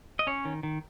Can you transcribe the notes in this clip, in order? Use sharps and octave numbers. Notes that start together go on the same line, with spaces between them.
D#5
C#4 C#5
D#3
D#3